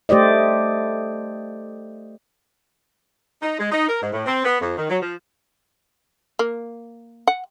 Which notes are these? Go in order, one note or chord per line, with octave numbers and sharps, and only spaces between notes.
A3 G4 C5 D5 D#5
D#4
G#3
D#4
A#4
G#2
A2
C4
B3
F2
D#3
F#3
F3
A#3
F#5